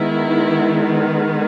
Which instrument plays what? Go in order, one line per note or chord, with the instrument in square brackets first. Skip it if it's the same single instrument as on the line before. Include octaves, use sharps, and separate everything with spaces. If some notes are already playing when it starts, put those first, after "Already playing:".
Already playing: [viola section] D#3 G#3 B3 E4